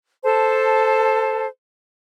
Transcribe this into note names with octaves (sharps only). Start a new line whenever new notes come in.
A4 C5 A5